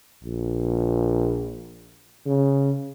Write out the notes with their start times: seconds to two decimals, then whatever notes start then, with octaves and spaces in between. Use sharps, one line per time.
0.24 A#1
2.26 C#3